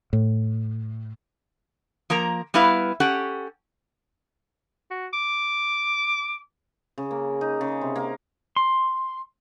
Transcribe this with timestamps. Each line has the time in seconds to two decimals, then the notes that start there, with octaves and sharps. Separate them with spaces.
0.13 A2
2.10 F3 A#3 A#4 A#5
2.54 G3 B3 E4 B4 F5
3.00 C#4 G4 A4 F#5
4.90 F#4
5.13 D6
6.98 C#3
7.11 A#3
7.41 D#4
7.61 C#3
7.81 C3
7.96 A#3
8.56 C6